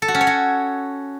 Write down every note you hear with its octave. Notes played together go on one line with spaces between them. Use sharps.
A4
F#4
C#4
C#5
F#4